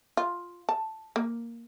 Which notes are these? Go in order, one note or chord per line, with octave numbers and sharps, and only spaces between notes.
F4
A5
A#3